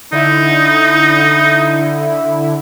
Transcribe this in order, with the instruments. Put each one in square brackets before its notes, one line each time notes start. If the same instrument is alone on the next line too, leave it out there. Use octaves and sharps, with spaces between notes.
[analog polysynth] D3 E4 [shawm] D#4